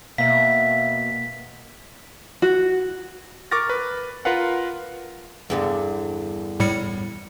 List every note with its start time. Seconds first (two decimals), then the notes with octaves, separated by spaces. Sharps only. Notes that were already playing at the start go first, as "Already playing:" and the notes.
0.18 B2 A#3 E5 F5 B6
2.42 F#4
3.51 A#4 C#6 D6 F6 A6 A#6
3.69 B4
4.25 F4 A#4 B4 F5 F#5
5.50 E2 G2 D3
6.60 A2 G3 C#7